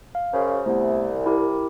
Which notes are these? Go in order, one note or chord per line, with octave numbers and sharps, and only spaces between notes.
F5
F#2 C#3 C5
C2 A3 B3
E4 G4 A#4